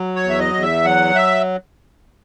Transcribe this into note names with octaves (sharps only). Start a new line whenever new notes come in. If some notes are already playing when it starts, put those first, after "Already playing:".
Already playing: F#3
C#5
E2
E5
D#5
E2
E5
F#3 F#5
E5